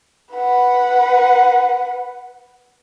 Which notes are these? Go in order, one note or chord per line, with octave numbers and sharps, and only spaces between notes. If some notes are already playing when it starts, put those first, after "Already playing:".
B4 F#5